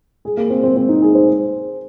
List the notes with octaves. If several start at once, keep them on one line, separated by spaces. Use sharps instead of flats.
G#4
A#3
C4
C4
C4
D#4
G#4
C5